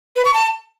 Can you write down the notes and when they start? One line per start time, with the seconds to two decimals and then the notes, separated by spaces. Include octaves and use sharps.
0.16 B4
0.25 C#6
0.34 A5